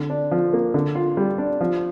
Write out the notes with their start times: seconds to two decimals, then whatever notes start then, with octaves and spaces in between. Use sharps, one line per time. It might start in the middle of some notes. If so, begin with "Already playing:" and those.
Already playing: D3
0.10 D4
0.31 F3
0.53 A#3
0.74 D3
0.95 F4
1.17 G3
1.38 D4
1.61 F3